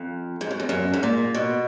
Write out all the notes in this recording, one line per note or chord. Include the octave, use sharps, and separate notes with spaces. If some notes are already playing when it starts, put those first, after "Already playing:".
Already playing: F2
G#2
F#2
F2
F#2
G#2
A#2
B2